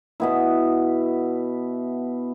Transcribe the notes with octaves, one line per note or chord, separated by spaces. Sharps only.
B2 B3 E4